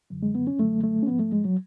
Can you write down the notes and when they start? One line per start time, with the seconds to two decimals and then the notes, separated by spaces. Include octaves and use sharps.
0.10 F#2 D3 F#3
0.23 G#3
0.35 B3
0.47 C#4
0.59 F#2 D3 F#3 A3
0.83 A3
1.03 C#4
1.07 G#2 F3 B3
1.19 A3
1.32 G#3
1.45 F#3